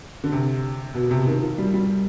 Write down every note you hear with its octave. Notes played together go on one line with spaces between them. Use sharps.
D3
C3
B2
C3
D#3
F3
G3
G3